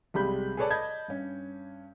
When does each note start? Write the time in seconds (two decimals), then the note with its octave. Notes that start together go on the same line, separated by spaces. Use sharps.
0.14 B1 C3 G3 G#3 B5 G6
0.57 G#4 A4 B4 C#5 D5 A5
0.70 D#5 A5 B5 G6 G#6
1.08 G2 C#4